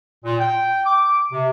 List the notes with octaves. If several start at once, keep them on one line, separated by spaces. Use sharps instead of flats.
A#2
G5
D6
C3